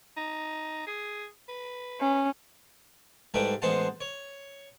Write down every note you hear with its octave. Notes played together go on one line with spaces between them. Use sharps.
D#4
G#4
B4
C#4
G#2 G3 A3 E4 B4 G5
A1 G#3 B3 C5 F#5 A5
C#5